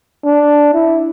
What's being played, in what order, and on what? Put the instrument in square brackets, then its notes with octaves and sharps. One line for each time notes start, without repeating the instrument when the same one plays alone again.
[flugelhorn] D4
E4